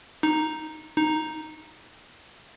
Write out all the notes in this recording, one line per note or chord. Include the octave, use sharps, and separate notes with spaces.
D#4
D#4